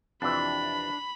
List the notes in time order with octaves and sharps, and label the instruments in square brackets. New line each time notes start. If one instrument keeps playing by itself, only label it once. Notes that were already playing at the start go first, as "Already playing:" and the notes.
[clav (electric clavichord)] F2 C3 E3 [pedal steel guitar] D4 [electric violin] B5